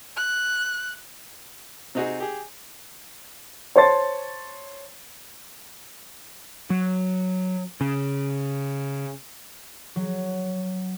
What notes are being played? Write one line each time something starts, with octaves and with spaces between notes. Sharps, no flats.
F#6
C3 C4 D#4 F#4 G#4
G4 G#4
C5 C#5 A5 C6 A6
F#3
C#3
F#3